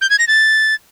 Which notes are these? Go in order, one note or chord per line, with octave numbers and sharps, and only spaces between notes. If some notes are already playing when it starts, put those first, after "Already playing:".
G6
G#6
A#6
A6